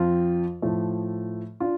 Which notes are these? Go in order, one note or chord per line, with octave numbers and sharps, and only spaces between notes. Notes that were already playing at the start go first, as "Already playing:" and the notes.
Already playing: F2 F3 C4 F4
A2 F3 A3
D4 F4